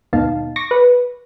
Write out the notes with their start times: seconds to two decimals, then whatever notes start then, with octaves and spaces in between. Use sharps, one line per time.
0.13 D#2 G#2 B2 D#4 F5 A5
0.56 C#6 D6 A#6
0.71 B4